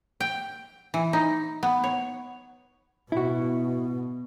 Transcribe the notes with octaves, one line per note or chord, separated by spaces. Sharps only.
G5
E3
D#4
B3
C#5
B2 E4 F#4